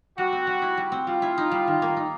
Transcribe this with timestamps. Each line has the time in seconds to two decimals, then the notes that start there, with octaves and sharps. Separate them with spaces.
0.18 G3 F#4
0.33 C4
0.47 G3
0.62 E4
0.77 G3
0.92 C4
1.07 G3 F4
1.22 E4
1.38 D#4
1.51 G3
1.67 D#3
1.82 A#3
1.97 D#4